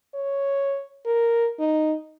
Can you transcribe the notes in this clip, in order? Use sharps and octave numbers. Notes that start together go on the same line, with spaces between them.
C#5
A#4
D#4